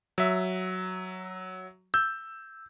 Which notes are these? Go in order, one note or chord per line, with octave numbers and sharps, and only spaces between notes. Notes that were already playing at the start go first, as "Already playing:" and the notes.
F#3 E5
E6 G6